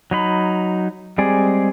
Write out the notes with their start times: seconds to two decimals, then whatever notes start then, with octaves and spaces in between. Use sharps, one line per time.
0.11 F#3 D#4 B5
1.18 G3 G#3 C4 G#4 D5